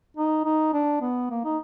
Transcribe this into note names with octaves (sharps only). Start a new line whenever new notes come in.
D#4
D#4
D4
B3
A#3
D#4